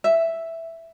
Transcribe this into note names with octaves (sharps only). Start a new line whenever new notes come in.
E5